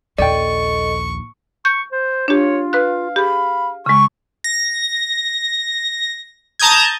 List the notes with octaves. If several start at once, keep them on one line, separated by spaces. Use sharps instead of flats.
A#1 D#2 A4 D5 D#5 G5 C#6
C#6 G6
C5
D4 F4 G4 C#5
B4 F5 F#6
G4 G#4 B5
C#3 G#3 C#6
A#6
A5 A#5 D#6 G6 G#6